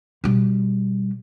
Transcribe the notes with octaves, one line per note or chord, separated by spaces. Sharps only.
B2 G3